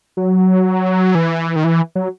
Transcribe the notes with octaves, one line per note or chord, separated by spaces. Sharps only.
F#3
E3
D#3
E3
F#3